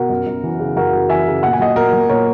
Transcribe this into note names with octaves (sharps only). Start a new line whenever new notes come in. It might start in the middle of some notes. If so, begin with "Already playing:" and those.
Already playing: B2 F#4 A#4
F#2
F#2
E3
C#3
F#2 F#4 A#4
F#2
E3 E5 G#5
C#3
A#2 F#5
G#5
F#3 D#5 F#5
A#2 F#4 A#4
F#3
A#2 A#4 C#5